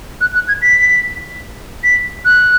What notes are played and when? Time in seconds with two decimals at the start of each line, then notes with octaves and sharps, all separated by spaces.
0.21 F#6
0.35 F#6
0.48 G#6
0.62 B6
1.84 B6
2.25 F#6